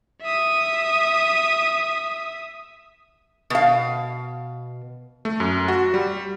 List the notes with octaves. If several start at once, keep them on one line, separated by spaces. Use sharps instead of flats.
E5 D#6
B2 F5
A3
F#2
F#4
G3